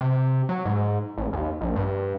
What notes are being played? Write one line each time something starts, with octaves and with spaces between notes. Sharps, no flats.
C3
F#3
G#2
A1
D#2
A#1
G2